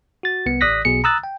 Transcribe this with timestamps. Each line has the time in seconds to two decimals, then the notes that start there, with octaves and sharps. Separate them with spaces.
0.23 F#4 A6
0.46 C2 B3 C#7
0.61 A1 D5 D#6 F#6 A#6 B6
0.85 B1 B2 G#4 C#7
1.04 A#5 D#6 E6 F#6 A6
1.23 G5